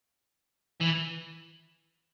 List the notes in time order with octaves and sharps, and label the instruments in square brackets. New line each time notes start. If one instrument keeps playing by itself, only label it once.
[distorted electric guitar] E3